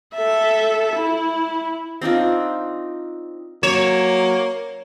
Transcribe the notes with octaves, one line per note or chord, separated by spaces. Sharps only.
A4 E5
E4
C4 D4 D#4 F4
F#3 A#3 C#5 E7